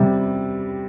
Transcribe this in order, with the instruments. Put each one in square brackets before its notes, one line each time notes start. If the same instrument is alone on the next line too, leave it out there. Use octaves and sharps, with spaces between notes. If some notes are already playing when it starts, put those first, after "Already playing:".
Already playing: [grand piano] C3 G3